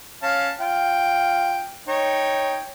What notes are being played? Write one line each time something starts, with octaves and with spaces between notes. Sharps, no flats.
C#4 F5 A5
F4 G5
D#4 C#5 G5